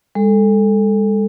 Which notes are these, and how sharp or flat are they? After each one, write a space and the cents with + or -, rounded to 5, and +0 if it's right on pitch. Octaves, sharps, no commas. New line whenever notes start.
G#3 -40 A4 +0